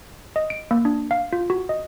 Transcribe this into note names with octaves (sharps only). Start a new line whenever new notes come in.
D#5
D7
A#3
D4
F5
F4
F#4
D#5